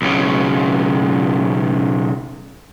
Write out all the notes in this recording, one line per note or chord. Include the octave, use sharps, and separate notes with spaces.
B1 C#3